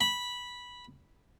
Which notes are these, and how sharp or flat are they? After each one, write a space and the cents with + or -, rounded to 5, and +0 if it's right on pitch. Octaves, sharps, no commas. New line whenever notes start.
B5 -10